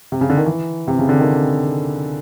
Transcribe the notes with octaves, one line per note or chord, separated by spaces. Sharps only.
C3
C#3
D3
D#3
E3
C3
C#3
D3
D#3